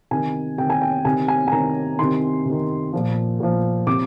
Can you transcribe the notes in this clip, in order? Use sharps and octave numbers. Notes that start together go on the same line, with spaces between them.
C3 D#3 G#5
C3 D#3 G5
G#5
G5
C3 D#3 G#5
G#5
G#5
C3 D#3 A#5
C3 D#3 C6
C3 D#3
A#2 F3
A#2 F3
C3 F3 D6